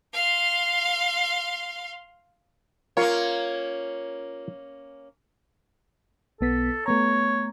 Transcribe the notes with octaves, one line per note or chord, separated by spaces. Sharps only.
F5 C6
A#3 C#4 F4 A#4 C#5 F5
B1 B3 A4 B6
A3 B3 C#5 A#5